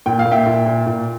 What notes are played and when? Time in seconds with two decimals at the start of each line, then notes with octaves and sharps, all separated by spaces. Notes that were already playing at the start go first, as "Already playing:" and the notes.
0.06 A#2 G5
0.19 F5
0.25 A#2
0.31 E5 G5
0.46 A#2
0.66 A#2
0.86 A#2